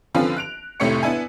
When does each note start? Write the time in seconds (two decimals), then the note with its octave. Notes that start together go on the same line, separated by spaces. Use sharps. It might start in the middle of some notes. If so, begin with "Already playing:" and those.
0.15 D3 F3 C4 C#4 F4 B4
0.37 F#6 D7 F7
0.80 F1 A2 C3 A3 C#5 C#7
1.03 B3 D4 E4 G#5